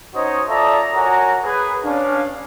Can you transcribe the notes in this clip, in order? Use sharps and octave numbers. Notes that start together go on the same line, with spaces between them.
C#4 D#4 F#4 C5 C#5 D#5
F4 A4 D5 E5 A#5 D#6
F#4 A#4 C#5 F#5 G#5 A#5
G#4 B4
C#4 D4 F5